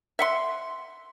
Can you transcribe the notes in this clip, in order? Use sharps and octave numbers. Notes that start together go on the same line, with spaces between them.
E5 F#5 C6